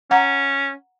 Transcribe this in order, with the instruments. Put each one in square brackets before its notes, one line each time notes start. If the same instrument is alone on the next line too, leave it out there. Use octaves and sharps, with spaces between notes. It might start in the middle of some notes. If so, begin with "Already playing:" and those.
[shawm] C#4 [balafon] F#5 A#5